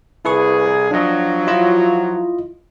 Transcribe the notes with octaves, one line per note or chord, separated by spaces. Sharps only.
C2 E4 G#4 B4 C#6
F3 F#3 D4 D#5
E4 F4 D#5